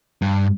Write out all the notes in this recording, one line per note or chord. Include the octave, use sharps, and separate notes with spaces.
G2